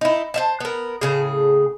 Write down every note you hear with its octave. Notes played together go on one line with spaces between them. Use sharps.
D#4 E4
C5 E5 A5
B3 A#4
A2 C#3 G#4